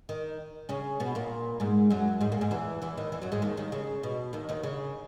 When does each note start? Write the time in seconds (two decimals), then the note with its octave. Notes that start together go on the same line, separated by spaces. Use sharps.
0.09 D#3 D#4
0.69 C#3 C#4
1.00 B2 B3
1.15 A#2 A#3
1.60 G#2 G#3
1.90 F#2 F#3
2.21 G#2 G#3
2.32 A#2 A#3
2.41 G#2 G#3
2.51 E2 E3
2.82 E2 E3
2.97 D#2 D#3
3.12 E2 E3
3.22 F#2 F#3
3.32 G#2 G#3
3.42 D#2 D#3
3.57 D#2 D#3
3.72 C#3
4.03 B2
4.33 D#2 D#3
4.49 D#2 D#3
4.63 C#3